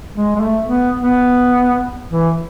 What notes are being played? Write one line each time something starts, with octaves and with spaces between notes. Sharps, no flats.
G#3
G#3
A3
B3
B3
E3